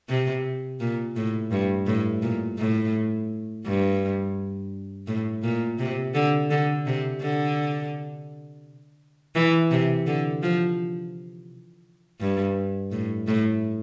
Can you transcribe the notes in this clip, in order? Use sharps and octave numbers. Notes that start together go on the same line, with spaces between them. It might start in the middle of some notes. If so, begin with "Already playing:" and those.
C3
A#2
A2
G2
A2
A#2
A2
G2
A2
A#2
C3
D3
D3
C3
D3
E3
C3
D3
F3
G2
A2
A2